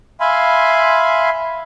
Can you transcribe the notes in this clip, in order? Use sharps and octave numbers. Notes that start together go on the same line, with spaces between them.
E5 F5 G#5 B5 C6